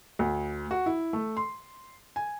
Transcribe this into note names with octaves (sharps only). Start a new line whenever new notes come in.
D2
F#4
E4
A3
C6
G#5